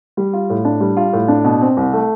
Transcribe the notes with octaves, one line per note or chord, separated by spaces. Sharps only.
G3
F4
A2
D4
G3
F4
A2
D4
B2
C4
C2
A3